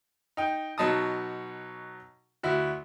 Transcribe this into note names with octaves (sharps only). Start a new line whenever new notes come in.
D#4 G5
B2 F#3 D#4 A5 D#6
D2 E4 F#4